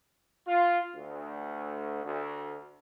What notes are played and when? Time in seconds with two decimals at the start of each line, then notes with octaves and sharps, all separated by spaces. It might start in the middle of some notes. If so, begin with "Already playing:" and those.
0.47 F4
0.94 D2
2.04 D2